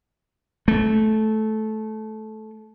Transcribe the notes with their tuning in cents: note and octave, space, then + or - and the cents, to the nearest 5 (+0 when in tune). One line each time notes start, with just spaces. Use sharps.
A3 -15